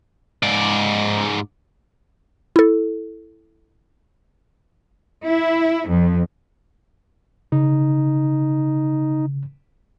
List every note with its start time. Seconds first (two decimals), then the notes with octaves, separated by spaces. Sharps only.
0.43 G#2 D5
2.56 E4 A4
5.28 E4
5.88 F2
7.52 C#3 D#4